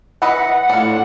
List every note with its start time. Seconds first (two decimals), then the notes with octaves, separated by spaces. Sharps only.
0.22 E3 B4 D#5 F#5
0.69 A2 D4 F4